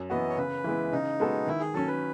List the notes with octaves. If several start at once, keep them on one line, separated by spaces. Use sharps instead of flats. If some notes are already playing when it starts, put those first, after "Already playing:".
Already playing: F#2
E3 B3 F#4 D#5
C#5
C#3 B4
E3 G#3 B3 E4
C#3 D#4
G#3 B3 F#4 A4
D#3 E4
G#4
F#3 C#4 A4
B4